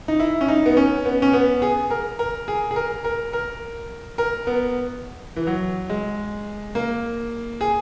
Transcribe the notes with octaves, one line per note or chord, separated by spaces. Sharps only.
D#4
E4
C#4
D#4
B3
C#4
B3
C#4
B3
G#4
A#4
A#4
G#4
G#4
A#4
A#4
A#4
A#4
B3
E3
F#3
G#3
A#3
G#4